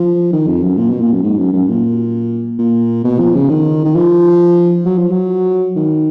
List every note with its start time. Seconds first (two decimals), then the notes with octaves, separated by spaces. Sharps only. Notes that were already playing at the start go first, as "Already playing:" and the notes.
Already playing: F3
0.33 D#3
0.47 F2
0.63 F#2
0.78 A#2
0.89 B2
1.01 A#2
1.12 F#2
1.23 G#2
1.38 F#2
1.53 F#2
1.69 A#2
2.58 A#2
3.04 B2
3.19 F3
3.35 C#3
3.49 D#3
3.84 D#3
3.95 F3
4.85 F#3
4.98 F3
5.11 F#3
5.76 D#3